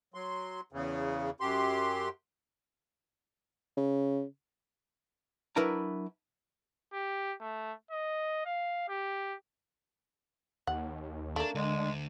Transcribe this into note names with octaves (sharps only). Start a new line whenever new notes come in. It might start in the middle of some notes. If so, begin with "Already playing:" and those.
F#3 C6
E2 C#3
F#2 G4 C6
C#3
F#3 D4 E4 A#4 B4 A#5
G4
A3
D#5
F5
G4
D#2 F#5
A3 A#3 D4
D2 D3 G#3